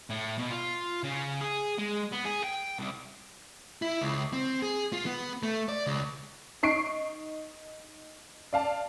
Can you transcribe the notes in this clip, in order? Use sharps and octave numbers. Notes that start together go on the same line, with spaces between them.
A2
B2
F4
C#3
G#4
G#3
B3
G#4
G5
C2
E4
C#2
C4
G#4
F4
B3
A3
D5
C#2
D#4 C#6 C7 D7
D5 F5 A5